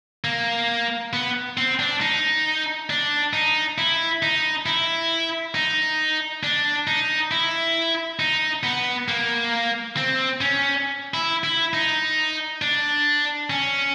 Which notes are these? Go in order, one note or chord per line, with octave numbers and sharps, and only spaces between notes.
A#3
B3
C4
D4
D#4
D4
D#4
E4
D#4
E4
D#4
D4
D#4
E4
D#4
B3
A#3
C4
C#4
E4
E4
D#4
D4
C#4